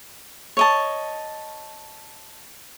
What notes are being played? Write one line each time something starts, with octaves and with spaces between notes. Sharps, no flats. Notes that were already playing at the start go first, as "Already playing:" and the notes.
C#5 D#5 A5